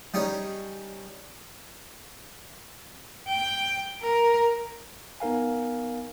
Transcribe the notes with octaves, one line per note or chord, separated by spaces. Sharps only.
G3 C#4 D#4 G#4 G#5
G5
A#4
B3 D#4 A#4 F5 G#5